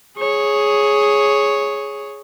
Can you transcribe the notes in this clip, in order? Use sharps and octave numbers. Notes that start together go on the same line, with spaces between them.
G#4 C#5